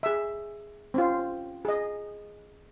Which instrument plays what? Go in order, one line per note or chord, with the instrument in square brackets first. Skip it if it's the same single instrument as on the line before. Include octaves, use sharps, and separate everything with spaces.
[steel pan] G#4 E5
C4 C#4 F4
G#4 D#5